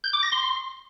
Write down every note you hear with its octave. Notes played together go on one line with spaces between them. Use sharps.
G6
D6
A#6
C6